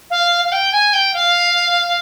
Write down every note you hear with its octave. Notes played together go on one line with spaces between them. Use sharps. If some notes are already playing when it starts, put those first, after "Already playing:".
F5
F5
G5
G#5
G5
F5